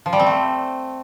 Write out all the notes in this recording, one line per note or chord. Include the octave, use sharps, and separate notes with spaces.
F3
G3
C4
A3